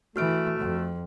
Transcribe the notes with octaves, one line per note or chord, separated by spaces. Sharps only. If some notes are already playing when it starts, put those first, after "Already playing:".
E3 A3 F#4 F6 D7
F2